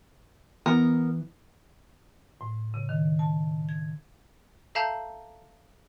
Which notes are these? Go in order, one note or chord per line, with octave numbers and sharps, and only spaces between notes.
E3 B3 A#4
A2
C#3
D#3
A5
G#6
A4 E5 F5 A5 A#5 G6